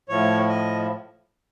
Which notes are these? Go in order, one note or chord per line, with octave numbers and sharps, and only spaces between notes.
A2 F3 C#5
D#5